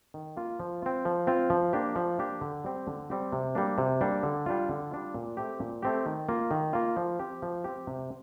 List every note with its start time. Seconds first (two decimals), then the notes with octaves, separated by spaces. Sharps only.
0.14 D#3
0.37 A#3 F4
0.60 F3
0.82 C4 F4
1.05 F3
1.27 C4 F4
1.50 F3
1.73 A#3 D4 G4
1.96 F3
2.18 A#3 D4 G4
2.41 D3
2.64 G3 C4 G4
2.87 D3
3.10 G3 C4 G4
3.32 C3
3.55 G3 A#3 D4
3.78 C3
4.01 G3 A#3 D4
4.23 D3
4.46 G3 D4 F4
4.69 D3
4.91 G3 D4 F4
5.14 A#2
5.37 A3 C4 G4
5.60 A#2
5.82 A3 C4 G4
6.06 D#3
6.29 A#3 F4
6.51 D#3
6.73 A#3 F4
6.96 F3
7.19 C4 G4
7.42 F3
7.64 C4 G4
7.87 C3